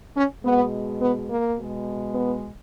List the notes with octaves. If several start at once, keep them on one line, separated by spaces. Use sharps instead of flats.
C#4
B2 G#3 B3
B3
A#3
B2 G#3
B3